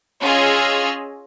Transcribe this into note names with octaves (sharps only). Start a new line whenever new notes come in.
C#4 F4 G#4 D#5 E6 F6